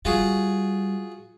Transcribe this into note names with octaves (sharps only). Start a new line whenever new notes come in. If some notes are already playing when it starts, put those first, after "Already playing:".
G3 F4 F#4 G#4